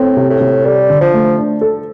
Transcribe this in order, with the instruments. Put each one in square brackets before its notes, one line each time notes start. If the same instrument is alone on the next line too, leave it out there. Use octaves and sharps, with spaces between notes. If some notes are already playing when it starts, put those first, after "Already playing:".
Already playing: [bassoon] A2 [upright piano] C4
[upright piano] C3
[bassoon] A2
[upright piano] C3
[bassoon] G3 [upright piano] A4
[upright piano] D3
[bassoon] F3
[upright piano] A3
D4
A4